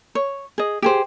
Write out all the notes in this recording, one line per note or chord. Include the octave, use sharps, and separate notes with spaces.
C#5
G#4 D#5
G4 G#4 C5